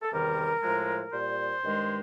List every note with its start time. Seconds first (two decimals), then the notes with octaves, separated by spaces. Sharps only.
0.02 A4
0.12 E2 C3 D#3 G3 A#4
0.63 A2 F3 G#3
1.12 A#2 G3 C5
1.63 G2 D#3 G#3